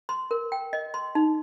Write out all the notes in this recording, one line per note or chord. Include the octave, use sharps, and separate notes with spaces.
C6
A#4
G5
D#5
C6
D#4